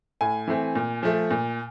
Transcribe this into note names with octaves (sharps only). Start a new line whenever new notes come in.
A2 G#5
E3 A3 C4
A#2
F3 A3
A#2